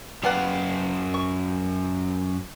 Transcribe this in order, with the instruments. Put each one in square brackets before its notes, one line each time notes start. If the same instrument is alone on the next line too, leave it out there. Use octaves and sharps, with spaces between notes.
[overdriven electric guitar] F#2 F5 [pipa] G3 B3 F#5
[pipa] C#6